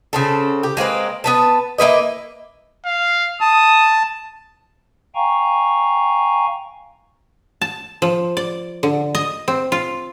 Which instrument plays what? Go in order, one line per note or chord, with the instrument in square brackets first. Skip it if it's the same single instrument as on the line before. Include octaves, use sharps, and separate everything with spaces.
[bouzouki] C#3 C4 A4
G4
G#3 A#3 C4 B4
B3 B4 A5
A#3 E4 B4 D#5
[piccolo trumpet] F5
[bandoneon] A5 [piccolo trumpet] D#6
[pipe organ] F5 G5 G#5 A#5 C#6
[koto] A5
F3
D5
D3
D#5
C4
F4